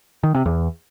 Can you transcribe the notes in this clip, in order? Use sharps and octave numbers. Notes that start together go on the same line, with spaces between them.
D#3
C3
E2